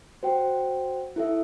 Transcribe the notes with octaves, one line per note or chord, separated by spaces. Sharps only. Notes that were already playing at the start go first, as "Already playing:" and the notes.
F#4 C5 G5
E4 A4 E5